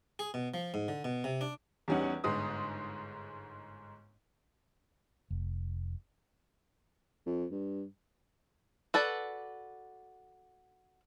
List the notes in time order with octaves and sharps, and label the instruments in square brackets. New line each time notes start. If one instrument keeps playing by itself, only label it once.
[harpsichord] G#4
B2
F3
G#2
D3
B2
C3
D4
[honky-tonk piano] E2 G3 C#4 D#4 F#5
G1 G#2 G#3 D#6
[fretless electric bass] F1
[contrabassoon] F2
G2
[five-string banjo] F#4 A4 B4 D5